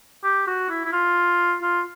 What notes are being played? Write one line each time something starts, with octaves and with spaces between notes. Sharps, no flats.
G4
F#4
E4
E4
F4
F4